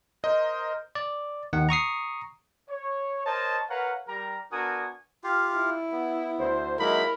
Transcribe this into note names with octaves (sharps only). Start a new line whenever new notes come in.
A#4 C5 D#5
D5
D#2 D#3 F#5
A#5 C#6 D#6 C7
C#5
A#4 C5 C#5 D#5 A5
A#4 B4 C#5 F5 F#5 A#5
G3 A#4 A#5
B3 D4 F#4 A#4 G#5 D#6
F4 G4 F5
E4
B3
D2 C5
F#3 G#3 A#3 D#4 E4 A#4 B5